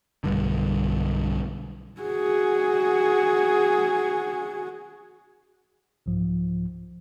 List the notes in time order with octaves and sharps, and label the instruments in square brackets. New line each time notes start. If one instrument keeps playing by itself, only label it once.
[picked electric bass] B1 G2 D3
[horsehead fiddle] F#4 G#4
[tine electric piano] C2 G#2 F3